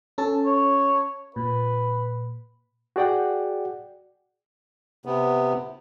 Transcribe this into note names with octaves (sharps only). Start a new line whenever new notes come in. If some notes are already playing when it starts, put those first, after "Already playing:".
C#4 A4 A5
C#5
A#2 B4
F#4 G#4 D5 F#5 G5
C3 B3